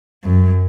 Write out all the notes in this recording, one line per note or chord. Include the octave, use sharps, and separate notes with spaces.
F#2